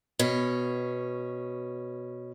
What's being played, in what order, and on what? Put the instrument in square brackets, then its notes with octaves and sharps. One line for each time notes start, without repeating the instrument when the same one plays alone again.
[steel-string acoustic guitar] B2 C#4